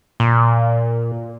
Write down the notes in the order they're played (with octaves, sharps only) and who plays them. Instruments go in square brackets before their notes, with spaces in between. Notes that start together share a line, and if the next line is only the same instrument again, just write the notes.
[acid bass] A#2